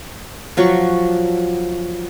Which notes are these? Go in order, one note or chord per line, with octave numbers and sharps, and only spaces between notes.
F3 F#3 F#4 C#6